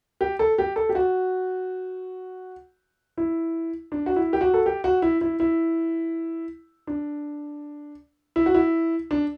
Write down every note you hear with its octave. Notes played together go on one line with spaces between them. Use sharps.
G4
A4
G4
A4
G4
F#4
E4
D4
F#4
E4
G4
F#4
A4
G4
F#4
E4
E4
E4
D4
E4
F#4
E4
D4